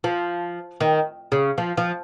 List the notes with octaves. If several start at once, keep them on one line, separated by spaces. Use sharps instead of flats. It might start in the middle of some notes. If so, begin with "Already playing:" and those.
F3
D#3
C#3
F3
F3